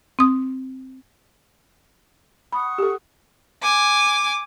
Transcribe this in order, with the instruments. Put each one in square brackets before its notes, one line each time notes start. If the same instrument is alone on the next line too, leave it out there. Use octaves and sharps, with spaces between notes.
[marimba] C4 D#6
[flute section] F#5 C#6 D#6 [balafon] B5
[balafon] G4 A4
[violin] G#5 D6